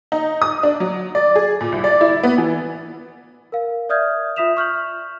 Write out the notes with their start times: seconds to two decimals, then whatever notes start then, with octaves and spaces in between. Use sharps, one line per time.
0.12 D#4
0.42 D#6
0.63 D4
0.80 F#3
1.15 D5
1.36 G#4
1.61 A#2
1.72 C2
1.84 D5
2.01 E4
2.23 B3
2.38 E3
3.52 A#4 F5
3.89 D5 E5 D#6 F6 G6 G#6
4.36 F4 E5 D#6 B6 E7 F7
4.57 C#6 F6 G6 F#7